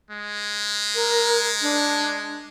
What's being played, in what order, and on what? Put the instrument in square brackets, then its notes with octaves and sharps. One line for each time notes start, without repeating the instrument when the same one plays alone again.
[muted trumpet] G#3
[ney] A#4
D4